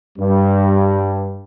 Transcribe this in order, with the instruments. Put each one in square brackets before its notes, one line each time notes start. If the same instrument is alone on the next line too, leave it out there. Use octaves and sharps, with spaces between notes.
[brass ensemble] G2